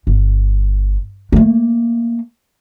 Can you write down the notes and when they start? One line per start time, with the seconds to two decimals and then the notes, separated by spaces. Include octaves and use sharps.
0.07 G1
1.32 A3 A#3